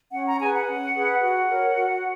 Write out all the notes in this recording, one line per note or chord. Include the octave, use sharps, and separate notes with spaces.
C#4 F#5
A#5
G#4 B4 G#5
F#5
C#4
G#4 B4
F#4 F#5
A#4 C#5
F#4